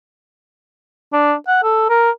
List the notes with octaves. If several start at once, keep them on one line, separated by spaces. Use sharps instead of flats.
D4
F#5
A4
A#4